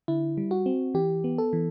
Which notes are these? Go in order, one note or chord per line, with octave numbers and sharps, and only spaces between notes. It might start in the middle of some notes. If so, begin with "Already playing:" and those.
D3 E4
G3
F#4
C4
E3 G4
B3
A4
E3